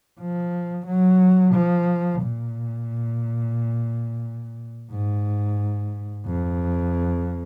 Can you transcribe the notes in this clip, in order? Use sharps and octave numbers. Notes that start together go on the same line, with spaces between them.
F3
F#3
F3
A#2
G#2
F2